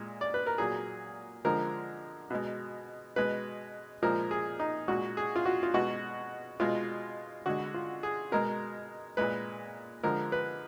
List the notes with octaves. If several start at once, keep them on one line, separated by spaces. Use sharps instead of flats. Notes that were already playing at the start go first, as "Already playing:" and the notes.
Already playing: A#2 G#3
D5
B4
A#4
A#2 F#3 G#4
D3 F3 G#3 A#4
B2 G#3
B2 G#3 B4
A#2 F3 G#3 A#4
G#4
D#4
A#2 G#3 F#4
G#4
F4
F#4
F4
B2 G#3 F#4
B2 G#3 F4
D3 G#3 F#4
F4
G#4
B2 G#3 A#4
A#2 G#3 B4
D3 F3 G#3 A#4
B4